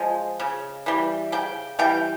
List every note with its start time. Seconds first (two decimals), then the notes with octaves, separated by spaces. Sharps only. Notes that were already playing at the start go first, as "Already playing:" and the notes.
Already playing: F3 G#3
0.40 C#3
0.86 E3 G3
1.32 C#3 G5
1.79 E3 G3 G5